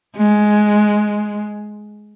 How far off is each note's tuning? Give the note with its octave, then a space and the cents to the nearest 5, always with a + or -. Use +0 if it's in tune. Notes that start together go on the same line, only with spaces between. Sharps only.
G#3 +10